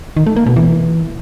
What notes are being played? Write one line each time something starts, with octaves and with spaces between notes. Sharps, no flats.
D#3
A3
A#3
B2
E3